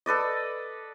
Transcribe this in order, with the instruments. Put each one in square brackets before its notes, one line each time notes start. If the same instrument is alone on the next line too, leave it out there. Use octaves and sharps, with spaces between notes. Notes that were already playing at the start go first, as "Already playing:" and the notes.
[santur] A4 B4 D5 D#5